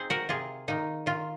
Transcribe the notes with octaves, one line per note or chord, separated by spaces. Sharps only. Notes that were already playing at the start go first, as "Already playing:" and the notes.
Already playing: C4 D#4 G#4 C5
F#4 A#4
C3 F4 G#4
D#3 A#3 D#4
D#3 F4